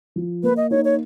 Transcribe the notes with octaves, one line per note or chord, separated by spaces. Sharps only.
F3
A#3 B4
D#5
D#4 C#5
C#5